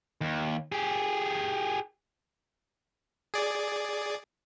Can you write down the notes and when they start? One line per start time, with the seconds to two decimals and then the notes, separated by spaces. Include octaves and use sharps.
0.21 D#2
0.72 G4 G#4
3.34 G#4 D5